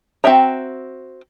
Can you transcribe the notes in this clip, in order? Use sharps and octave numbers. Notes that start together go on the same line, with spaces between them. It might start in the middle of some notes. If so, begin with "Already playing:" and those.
C4 F#4 E5 G5 A#5